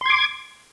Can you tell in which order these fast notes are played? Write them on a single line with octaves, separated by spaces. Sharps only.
C6 G#6 D6